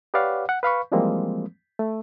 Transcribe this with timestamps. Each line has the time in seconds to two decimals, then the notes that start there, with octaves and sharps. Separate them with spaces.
0.14 G4 B4 C#5 D5 F5 F#5
0.49 F#5
0.63 B4 F5 B5 C#6
0.92 E3 F3 G3 G#3 A#3 C4
1.79 A3